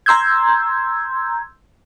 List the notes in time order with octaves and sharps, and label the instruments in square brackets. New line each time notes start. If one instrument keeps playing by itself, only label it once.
[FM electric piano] A#5 C6 E6 G6 G#6